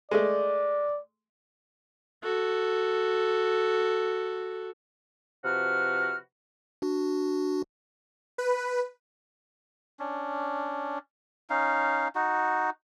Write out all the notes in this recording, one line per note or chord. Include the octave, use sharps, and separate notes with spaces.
G#3 A3 D5
F#4 A4
C3 F3 F#4 B4 F6
D4 F#4
B4
C#4 D4
C#4 D#4 F5
D#4 F#4